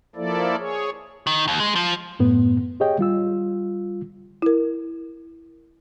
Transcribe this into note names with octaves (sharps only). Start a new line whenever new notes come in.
F3 A#3 E4 A4 D5
G#4 C#5
D#3
D#2
G#3
F3
F#2 A2 B3
G4 G#4 C#5 D#5 G5
G3 F4 E6
E4 A#4